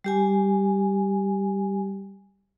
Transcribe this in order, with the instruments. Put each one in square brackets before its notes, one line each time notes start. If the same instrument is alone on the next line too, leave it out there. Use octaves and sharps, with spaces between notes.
[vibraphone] G3 G4 G#5